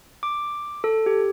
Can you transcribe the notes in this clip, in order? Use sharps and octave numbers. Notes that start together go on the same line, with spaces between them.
D6
A4
G4